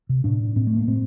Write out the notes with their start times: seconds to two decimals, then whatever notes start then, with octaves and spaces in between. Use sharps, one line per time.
0.09 C3
0.24 A2 D4
0.56 A2 C4
0.67 A3
0.77 A#3
0.87 A2 C4